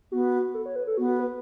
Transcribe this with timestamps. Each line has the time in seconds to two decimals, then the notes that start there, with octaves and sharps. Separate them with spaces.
0.12 B3 F#4
0.54 A4
0.66 C#5
0.76 B4
0.87 A4
0.97 B3 F#4
1.08 F#4
1.19 B4